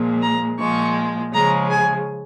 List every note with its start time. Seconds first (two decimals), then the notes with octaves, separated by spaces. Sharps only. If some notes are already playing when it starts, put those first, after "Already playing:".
Already playing: A#2 F3 G#3
0.22 A#5
0.59 A#2 F3 G#3 C#6
1.33 C#3 F3 G#3 A#5
1.70 G#5